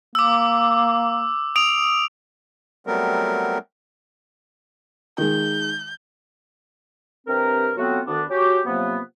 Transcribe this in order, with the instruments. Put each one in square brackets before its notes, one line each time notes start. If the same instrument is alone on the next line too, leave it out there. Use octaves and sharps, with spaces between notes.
[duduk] A#3 [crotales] D6 E6
[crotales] D#6 D7 F7
[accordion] F#3 G3 A3 B3 C4 A#4
[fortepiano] D#3 G#3 [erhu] G6
[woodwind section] G2 C3 C4 G4 A#4
F#3 A3 B3 C4 F4 F#4
D2 D#3 B3 D4
C#4 F#4 G4
C3 F3 F#3 A#3 B3